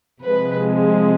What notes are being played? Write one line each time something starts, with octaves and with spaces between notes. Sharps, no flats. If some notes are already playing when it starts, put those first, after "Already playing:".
C3 F3 G#3 B4